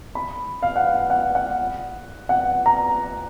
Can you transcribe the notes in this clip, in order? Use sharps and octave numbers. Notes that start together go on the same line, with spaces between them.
B5
F5
F#5
F5
F#5
F#5
F#5
A#5